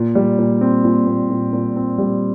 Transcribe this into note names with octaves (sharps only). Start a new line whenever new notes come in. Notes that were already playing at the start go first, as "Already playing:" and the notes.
Already playing: A#2
G3
A#2
C4
A#2
A#2
A#2
A#2
C4
G3